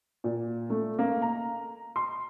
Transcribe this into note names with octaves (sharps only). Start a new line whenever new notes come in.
A#2
A3
A#3
A#5
C6